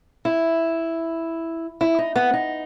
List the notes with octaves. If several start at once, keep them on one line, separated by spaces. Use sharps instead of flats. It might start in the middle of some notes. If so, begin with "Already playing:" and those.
E4
E4
D#4
B3
D#4